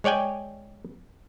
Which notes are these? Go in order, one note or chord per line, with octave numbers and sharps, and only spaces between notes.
G#3 C#5 D5 G5 G#5